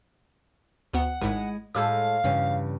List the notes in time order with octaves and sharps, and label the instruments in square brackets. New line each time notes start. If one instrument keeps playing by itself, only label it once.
[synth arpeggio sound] D2 B3 [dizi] F#5
[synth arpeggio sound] G#1 G#2 [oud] G#3 E4
[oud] A2 G#3 A4 [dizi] F5 [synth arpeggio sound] D6 E6 G6
[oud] E2 C#4 [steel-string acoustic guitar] G2 C#3